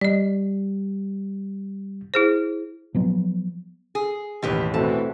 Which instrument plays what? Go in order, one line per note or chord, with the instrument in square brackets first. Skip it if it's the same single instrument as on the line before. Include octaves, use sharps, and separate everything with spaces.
[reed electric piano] G3 [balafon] D5 D#5
[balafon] E4 G#4 C5
[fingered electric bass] F3 F#3 B3
[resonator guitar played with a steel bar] G#4
[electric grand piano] A1 D#2 [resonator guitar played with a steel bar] B2 G4 B4
[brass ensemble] B2 E3 F#4 [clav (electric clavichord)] A3 C4 A4 [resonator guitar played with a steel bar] A5